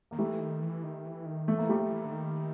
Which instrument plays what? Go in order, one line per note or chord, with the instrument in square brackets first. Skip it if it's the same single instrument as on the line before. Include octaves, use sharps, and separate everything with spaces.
[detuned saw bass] D#3 [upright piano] A#3
[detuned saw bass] E3 [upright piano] G3 A3
[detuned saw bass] D#3
E3
D#3
E3
D#3
[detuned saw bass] E3 [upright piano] A3
[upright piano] A#3
[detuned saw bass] F3 [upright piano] G3 A3
[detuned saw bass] F3
E3
D3
D#3